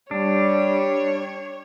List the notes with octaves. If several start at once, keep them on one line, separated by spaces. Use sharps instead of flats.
G3 D4 C#5